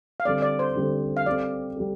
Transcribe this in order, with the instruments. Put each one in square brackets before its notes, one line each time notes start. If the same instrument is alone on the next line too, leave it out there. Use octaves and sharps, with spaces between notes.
[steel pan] F5
[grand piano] D3 G3 C4 A4 [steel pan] D5
[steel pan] D5
C5
[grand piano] D3 G3 C4 A4
[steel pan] F5
[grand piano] G3 C4 A4 [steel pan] D5
[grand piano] G3 C4 A4